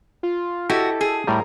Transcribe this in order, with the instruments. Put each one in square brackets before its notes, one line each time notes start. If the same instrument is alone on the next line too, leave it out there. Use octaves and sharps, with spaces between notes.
[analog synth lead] F4
[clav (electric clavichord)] E4 G4 D#5 [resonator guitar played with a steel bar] F#4 [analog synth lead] A4
[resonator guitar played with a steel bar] G#4
[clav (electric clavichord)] A2 G3 [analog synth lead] A#4